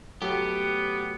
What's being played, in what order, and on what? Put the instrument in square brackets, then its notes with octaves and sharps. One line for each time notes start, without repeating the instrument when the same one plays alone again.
[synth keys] F#3 A3 [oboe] B3 [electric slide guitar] G4